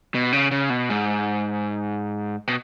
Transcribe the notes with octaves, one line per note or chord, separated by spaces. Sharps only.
B2
C#3
C#3
B2
G#2
B2